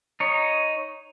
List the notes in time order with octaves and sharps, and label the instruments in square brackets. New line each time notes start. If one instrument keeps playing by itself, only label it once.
[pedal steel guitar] D#4 C#5